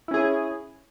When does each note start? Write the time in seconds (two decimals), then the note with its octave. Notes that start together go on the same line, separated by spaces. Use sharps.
0.08 E4
0.11 C#4
0.14 G#4